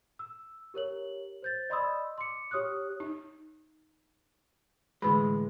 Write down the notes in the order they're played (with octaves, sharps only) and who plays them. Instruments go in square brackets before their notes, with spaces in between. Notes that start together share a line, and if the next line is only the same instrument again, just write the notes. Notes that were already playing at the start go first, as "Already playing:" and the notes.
[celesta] E6
G4 A#4 C#5 F#7
C5 G6 A6
D5 D#5 B5 C6 D#6 E6
C6 D6 C#7
G4 C#5 D#6 F6 F#6
[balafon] D#4
[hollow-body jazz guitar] A2 E3 G#3 [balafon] D3 B4 B5